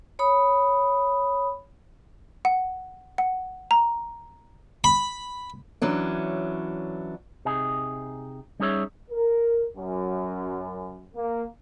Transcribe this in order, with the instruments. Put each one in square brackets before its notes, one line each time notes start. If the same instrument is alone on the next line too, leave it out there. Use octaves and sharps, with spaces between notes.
[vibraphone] C#5 B5 D#6
[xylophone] F#5
F#5
A#5
[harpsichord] B5
[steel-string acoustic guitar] E3 F#3 C#4 D4
[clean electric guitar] C3 D#4 G#4
G3 C#4 D#4 G#4 C#5 E5
[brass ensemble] A#4
F#2
A#3